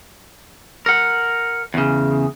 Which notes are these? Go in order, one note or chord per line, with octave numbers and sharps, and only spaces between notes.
A#4 F#5
E2 C#3